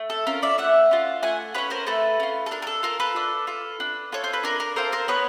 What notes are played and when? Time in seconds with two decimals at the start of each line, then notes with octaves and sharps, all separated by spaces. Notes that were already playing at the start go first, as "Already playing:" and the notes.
Already playing: A3
0.10 A4
0.27 C#4 F4 A#4
0.43 D5 E5
0.58 A3 E5 F#5
0.91 C#4 F4
1.23 A3 F#5 G#5
1.55 F4 B4 C#5
1.58 C#4
1.70 A#4 C5
1.87 A3 A4 B4
2.20 C#4 F4
2.46 A4
2.51 D4 A#4
2.62 A#4
2.67 A4
2.83 F4 A4 A#4
3.00 A4 B4
3.16 D4
3.47 F4 A4
3.80 D4
4.12 F4 A4 C#5
4.24 C5
4.33 B4
4.43 D4 A#4
4.60 A#4
4.76 F4 A4 A#4 C5
4.92 A#4 C5
5.08 B3 B4 C#5